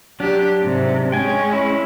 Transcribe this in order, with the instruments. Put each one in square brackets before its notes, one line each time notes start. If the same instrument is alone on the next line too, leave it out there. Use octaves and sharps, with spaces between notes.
[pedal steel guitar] F#3 D4 [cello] G4
[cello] G#2 C3
[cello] G#3 C#4 [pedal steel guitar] G5 G#5
[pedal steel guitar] E4